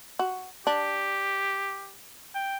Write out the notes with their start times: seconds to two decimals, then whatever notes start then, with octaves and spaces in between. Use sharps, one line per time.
0.19 F#4
0.67 D4 G4
2.35 G5